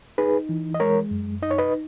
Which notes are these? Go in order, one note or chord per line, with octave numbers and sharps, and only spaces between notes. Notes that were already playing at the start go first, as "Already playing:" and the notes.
D#4 G#4 B4
E3
D#5
G#3 A#4 C#5
F#2
D#4 D#5
C#5
B4 D#5